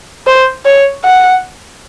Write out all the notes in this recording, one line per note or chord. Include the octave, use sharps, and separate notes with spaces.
C5
C#5
F#5